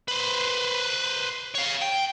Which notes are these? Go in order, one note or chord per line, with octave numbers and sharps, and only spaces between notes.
B4 C5
C#5 F5
G5